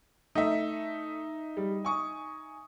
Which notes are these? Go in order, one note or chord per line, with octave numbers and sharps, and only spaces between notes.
A3 D#4 E5
G3
G#5 C#6 D#6